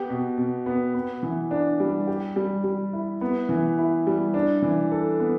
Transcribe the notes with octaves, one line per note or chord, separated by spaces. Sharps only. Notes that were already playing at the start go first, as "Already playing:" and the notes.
Already playing: B3 G4
B2
B2
B3
B3
E3
D4
G3
G4
G3
G3
E4
B3
E3
E4
G3
D4
E3
A4
B3